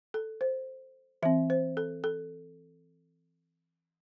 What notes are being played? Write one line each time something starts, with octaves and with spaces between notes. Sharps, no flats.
A4
C5
E3 C4 E5
C5
A4
A4